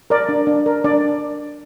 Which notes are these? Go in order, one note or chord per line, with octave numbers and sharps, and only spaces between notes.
A#4 D5
D4
D4
A#4
D4 D5